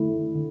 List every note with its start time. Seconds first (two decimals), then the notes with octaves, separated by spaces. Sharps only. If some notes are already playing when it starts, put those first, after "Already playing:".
Already playing: D3 A3 E4
0.35 D3